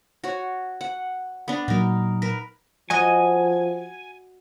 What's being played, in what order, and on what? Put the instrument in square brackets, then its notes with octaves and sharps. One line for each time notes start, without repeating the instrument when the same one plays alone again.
[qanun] F#4 C#5
F#5
B3 D4
[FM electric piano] A#2 F#3 [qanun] D#4 A#4
[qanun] A#4 B4
[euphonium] F3 [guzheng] F#4 D#5 [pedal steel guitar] G#5